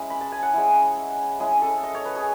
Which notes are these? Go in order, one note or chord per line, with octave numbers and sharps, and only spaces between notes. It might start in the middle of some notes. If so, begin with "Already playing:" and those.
Already playing: G#3 C#4 E4
B5
A5
G#5
F#5
G#3 C#4 E4
G#3 C#4 E4 G#4
A4
D#5
C#5
B4
G#4